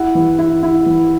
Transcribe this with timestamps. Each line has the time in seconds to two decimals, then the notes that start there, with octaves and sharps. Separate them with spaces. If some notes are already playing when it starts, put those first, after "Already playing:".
Already playing: E4 F#5
0.15 E3
0.39 E4
0.63 E4
0.86 E3